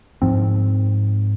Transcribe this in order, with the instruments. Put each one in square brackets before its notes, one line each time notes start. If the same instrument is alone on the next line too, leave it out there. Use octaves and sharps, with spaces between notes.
[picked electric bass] G#2 F3 C4